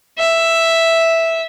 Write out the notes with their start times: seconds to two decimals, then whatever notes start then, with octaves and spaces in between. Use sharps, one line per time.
0.18 E5